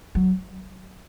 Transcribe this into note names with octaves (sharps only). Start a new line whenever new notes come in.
F#3